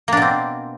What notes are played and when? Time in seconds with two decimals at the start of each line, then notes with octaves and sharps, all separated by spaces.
0.08 A#3
0.13 D4
0.17 B2
0.22 C4